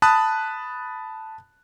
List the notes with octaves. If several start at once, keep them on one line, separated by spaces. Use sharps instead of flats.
A5 B5 D#6 F#6